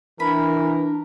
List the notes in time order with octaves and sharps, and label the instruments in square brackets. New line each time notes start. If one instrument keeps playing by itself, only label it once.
[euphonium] E3 [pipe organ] D4 [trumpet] A#4 [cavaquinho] B5